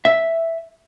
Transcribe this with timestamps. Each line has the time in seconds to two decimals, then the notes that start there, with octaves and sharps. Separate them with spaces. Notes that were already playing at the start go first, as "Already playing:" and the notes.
0.05 E5